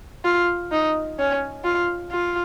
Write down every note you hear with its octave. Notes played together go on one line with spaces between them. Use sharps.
F4
D#4
C#4
F4
F4